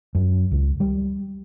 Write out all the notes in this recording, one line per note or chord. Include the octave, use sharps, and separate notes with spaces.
F#2
C#2
G3